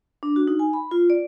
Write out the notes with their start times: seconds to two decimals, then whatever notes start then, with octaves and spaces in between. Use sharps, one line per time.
0.23 D4
0.36 F#4
0.47 D#4
0.59 G#5
0.73 B5
0.91 F4
1.10 D5